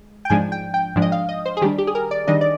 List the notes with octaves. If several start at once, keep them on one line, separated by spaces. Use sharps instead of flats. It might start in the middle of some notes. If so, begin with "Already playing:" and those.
Already playing: G#3
G5
G#2 F3 G#3 D4 G#5
G5
G5
G#2 F3 G#3 D4
D#5
F5
D#5
C5
G#4
D#3 G3 D4 G4
G4
G#4
A#4
D5
D#3 G3 D4 D#5
D5